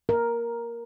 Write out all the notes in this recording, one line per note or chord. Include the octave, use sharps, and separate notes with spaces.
A#4